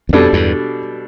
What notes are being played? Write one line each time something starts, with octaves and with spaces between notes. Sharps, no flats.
E2
F2 B2 G3 D4 A4
E2 G2